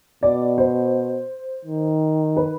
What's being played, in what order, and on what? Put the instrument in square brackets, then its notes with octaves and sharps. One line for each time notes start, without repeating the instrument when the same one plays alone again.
[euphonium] B2 [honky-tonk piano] D5
[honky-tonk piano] C5
[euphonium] D#3
[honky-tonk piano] B4